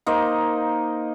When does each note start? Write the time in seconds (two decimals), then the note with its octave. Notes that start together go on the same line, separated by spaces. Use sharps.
0.06 A#3 D#4 C5 D#5